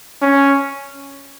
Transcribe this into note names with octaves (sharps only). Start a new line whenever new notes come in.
C#4